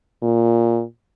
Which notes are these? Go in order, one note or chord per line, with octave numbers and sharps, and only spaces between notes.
A#2